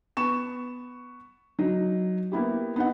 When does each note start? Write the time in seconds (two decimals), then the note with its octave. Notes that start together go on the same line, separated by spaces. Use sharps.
0.17 B3 C#6 E7
1.59 F#3 D#4
2.32 A#3 B3 E4 G4
2.76 B3 D#4 F#5